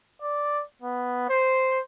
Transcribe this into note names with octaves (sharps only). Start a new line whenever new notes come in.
D5
B3
C5